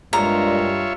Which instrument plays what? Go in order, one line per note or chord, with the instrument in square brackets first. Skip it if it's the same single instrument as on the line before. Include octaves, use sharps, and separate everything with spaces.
[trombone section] G2 [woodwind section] A#2 G#3 [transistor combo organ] F4 C#5 E5 [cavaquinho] A#5